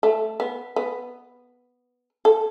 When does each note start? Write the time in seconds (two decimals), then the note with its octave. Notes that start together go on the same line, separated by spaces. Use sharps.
0.03 A3
0.40 B3
0.76 B3
2.25 A4